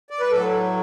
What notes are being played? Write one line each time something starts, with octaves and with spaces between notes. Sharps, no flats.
D5
B4
A2 F#3 A4